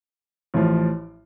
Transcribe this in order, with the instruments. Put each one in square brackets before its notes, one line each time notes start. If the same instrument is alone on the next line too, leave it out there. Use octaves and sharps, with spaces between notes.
[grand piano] A1 A2 F3